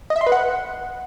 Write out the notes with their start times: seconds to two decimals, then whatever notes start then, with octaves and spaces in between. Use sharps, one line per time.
0.10 D#5
0.16 E5
0.21 C6
0.27 B4
0.32 F#5